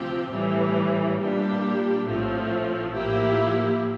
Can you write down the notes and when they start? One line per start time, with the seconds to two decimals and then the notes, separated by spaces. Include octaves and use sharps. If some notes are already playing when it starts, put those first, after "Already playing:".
Already playing: D2 C3 F3 C4 G4
0.32 A2 E3 G3
1.19 A#2 G3 D4 G4
2.08 A#1 A2 F3 A3 C4
2.96 A2 F3 A#3 E4 G4